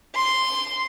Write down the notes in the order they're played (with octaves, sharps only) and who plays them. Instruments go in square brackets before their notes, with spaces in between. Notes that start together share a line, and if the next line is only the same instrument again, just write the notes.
[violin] C6